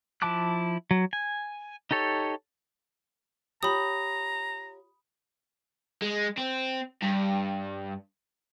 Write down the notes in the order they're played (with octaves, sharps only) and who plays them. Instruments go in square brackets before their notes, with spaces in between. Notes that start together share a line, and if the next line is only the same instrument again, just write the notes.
[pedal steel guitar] F3 E4 A5 D6 F#6
F#3
G#5
D#4 G4 A4 C#5
[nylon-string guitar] F4 G4 C#5 [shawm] A#5 [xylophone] B5 D#6
[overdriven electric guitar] G#3
C4
G2